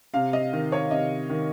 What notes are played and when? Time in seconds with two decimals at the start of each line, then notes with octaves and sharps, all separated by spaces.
0.14 C3 F5
0.33 D#5
0.53 D#3
0.72 C#5
0.91 C3 D#5
1.30 D#3